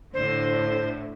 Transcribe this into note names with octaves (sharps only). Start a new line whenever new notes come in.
A2 D3 C5